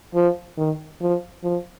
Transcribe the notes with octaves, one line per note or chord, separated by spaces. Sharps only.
F3
D#3
F3
F3